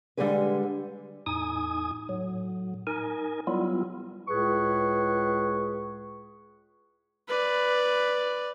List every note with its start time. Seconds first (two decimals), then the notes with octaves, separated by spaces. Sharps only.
0.17 D3 G3 G#3 G#4 B4
1.26 E2 A2 D#4 G#5 D#6
2.09 A2 F#3
2.87 D#4 A#4 G#5
3.47 F#3 G3 B3 E4 F4
4.28 C#2 A2 G#4 B4 C#6
7.28 B4 D5